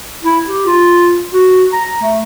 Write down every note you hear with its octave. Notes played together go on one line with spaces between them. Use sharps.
E4
G4
F4
F#4
A#5
A3